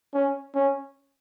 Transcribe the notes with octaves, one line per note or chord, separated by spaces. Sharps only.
C#4
C#4